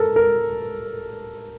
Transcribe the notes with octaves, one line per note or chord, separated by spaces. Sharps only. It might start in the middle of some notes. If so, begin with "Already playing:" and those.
Already playing: A4 A#4
A#4